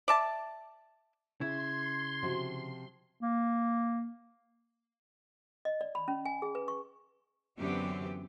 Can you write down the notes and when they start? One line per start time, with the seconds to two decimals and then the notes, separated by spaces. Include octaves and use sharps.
0.08 D5 E5 A5
1.41 C#3 E4 C6 G#6
2.22 C3 F3 F#4
3.21 A#3
5.65 D#5
5.81 D5
5.95 B5
6.08 C#4
6.25 G#5
6.42 G#4
6.55 B4
6.68 C#6
7.59 F#2 D3 E3 B3 C4 G4